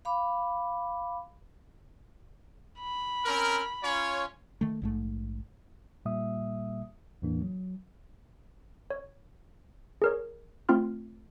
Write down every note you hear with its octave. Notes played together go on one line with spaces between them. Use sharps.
F5 B5 D6
B5
C4 C#4 A#4
C#4 F4 C#5
D#3 A3
A#1 G#2 A3
A#2 G3 A#3 E5 D#6
E2 A2 E3 A#3 D4
F#3
C#5
G#4 A#4 C#5
A3 C4 F4 C6 F6